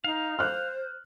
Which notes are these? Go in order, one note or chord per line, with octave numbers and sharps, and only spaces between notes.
D#4 F5
C5 F6 F#6